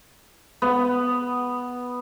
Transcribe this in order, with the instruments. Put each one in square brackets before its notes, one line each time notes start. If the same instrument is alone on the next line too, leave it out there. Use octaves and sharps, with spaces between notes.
[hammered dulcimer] B3